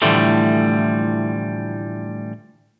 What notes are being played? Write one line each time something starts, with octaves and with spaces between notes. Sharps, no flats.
A2 D3 E3 F3 G3 A3